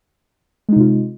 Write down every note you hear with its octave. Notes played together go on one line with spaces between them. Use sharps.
C3 G#3 D#4 F4